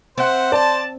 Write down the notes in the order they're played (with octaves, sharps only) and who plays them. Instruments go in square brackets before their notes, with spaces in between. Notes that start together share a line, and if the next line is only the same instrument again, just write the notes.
[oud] C4 [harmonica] C5 [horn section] E5 F#5
[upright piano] D5 [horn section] A5